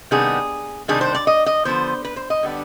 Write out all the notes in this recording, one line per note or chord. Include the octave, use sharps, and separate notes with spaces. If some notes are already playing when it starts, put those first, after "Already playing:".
C3 D#3 G3 B3 D4 G#4
C3 D#3 G3 D4 G#4
C5
D5
D#5
D#5
D3 F3 B3 C5
B4
C5
D#5
D3 G3 B3 D4